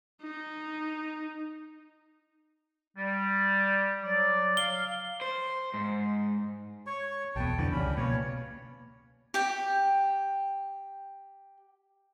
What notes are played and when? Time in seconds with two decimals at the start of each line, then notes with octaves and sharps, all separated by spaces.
0.22 D#4
2.97 G3
4.03 F#3 D5
4.57 F5 G7
5.21 C5
5.74 G#2
6.87 C#5 C#6
7.36 B1 E2 B3 G5 A5
7.58 F2 D3 E3
7.72 C#2 C#3 G3 C#4 B5
7.97 B2 A#3 B3 C#5
9.34 G4 G5